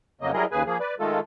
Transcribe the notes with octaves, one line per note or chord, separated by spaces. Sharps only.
F2 C#3 F#3 A#3 D#5
F#3 G3 E4 G#4 A#4 D#5
D#2 C#3 G#4 B4 G#5
F3 A#3 G#4
B4 D5
D#3 G#3 A3 F4 A4